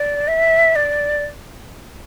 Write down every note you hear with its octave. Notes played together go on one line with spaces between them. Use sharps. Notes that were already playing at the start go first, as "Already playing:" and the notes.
Already playing: D5
E5
D5